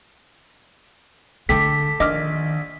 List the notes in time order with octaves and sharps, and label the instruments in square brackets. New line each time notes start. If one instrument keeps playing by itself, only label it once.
[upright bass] D3 A3 [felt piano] A4 G5 D6 [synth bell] B6
[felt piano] A#1 [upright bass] D#3 [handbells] D#5 D6 F6